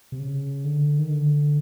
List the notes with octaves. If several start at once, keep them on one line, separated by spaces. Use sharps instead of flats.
C3
C#3
D3
D#3
D3